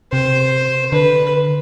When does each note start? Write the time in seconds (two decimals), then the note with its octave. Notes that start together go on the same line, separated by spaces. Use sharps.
0.12 C3 C5
0.92 D3 B4